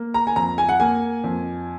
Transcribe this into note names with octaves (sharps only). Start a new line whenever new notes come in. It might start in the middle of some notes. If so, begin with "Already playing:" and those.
Already playing: A#3
A#5
G#5
F2 A#5
G#5
F#5
A#3 G#5
F2